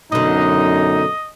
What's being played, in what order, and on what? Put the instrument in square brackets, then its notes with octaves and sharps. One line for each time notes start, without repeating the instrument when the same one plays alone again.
[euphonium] F#2 [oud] B2 D3 [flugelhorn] D#4 [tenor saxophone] D#5